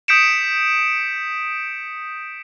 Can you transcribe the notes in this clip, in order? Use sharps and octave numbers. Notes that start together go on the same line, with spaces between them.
D#6 G6 B6 C#7 D7 E7